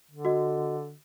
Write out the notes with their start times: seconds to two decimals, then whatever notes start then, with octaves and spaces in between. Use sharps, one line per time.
0.11 D3
0.25 F#4 D#5